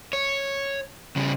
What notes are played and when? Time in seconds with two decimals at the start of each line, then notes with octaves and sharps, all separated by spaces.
0.13 C#5
1.16 C#3 G3